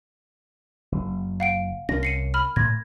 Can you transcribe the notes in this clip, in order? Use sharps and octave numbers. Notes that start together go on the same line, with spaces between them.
F#1
F5 F#5 D7
C2 C#4 A#4 A#6
C7 C#7 D#7
B5 F6
A2 G#6 A#6